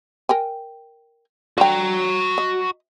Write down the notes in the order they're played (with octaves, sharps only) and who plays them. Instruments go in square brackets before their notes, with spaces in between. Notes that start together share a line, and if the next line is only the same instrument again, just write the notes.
[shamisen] A#4 G5 G#5
[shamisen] D3 G5 [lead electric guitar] F#4 A#5
[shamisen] D#5